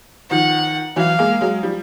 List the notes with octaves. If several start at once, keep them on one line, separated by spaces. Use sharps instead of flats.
D#3 F3 F#5
E3 F#3 F5
G#3 A#3
F#3 G#3
F3 G3